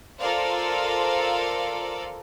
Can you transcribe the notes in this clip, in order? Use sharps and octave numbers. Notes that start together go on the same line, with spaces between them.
F4 A4 A#4 C5 D5 F5